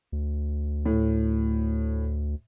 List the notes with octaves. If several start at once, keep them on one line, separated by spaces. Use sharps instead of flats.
D2
A2